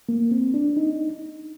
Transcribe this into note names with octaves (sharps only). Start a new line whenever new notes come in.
A#3
C4
D4
D#4